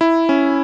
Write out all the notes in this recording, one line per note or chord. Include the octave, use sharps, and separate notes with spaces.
E4
C#4